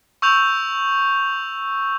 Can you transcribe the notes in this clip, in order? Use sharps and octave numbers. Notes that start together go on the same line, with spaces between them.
C#6 E6 G6 F7